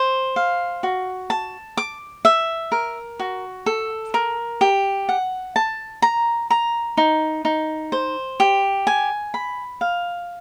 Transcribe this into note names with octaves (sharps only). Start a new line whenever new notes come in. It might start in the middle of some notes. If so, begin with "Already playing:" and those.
Already playing: C5
F5
F#4
A5
D6
E5
A#4
F#4
A4
A#4
G4
F#5
A5
A#5
A#5
D#4
D#4
C5
G4
G#5
B5
F5